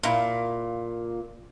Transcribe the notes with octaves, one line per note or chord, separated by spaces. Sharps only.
A#2 E4 F5